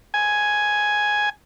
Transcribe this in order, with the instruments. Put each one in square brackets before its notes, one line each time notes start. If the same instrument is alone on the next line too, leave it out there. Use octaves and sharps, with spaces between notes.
[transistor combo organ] G#5